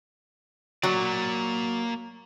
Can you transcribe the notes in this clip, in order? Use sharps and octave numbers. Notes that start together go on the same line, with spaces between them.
F#3 A#3 D5